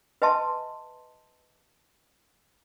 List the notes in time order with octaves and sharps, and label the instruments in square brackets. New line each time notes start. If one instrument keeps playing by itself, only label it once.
[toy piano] B4 D#5 E5 G#5 A5 C6